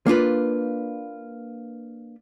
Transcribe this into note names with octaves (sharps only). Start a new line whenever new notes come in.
A#3 D4 F4 B4